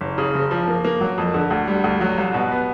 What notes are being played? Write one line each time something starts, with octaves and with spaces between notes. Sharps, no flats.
F#1
C#3
F#1
F3
A#3
A#3
F#3
F2
D3
D2
G3
D2
F#3
C2
B2
B3